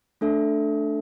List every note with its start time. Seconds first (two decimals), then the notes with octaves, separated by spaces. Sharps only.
0.21 A3 D4 A4 E5